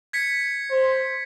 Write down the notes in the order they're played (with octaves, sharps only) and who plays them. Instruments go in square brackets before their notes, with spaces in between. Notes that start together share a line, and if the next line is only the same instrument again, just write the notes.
[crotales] G#6 B6 C#7
[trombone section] C5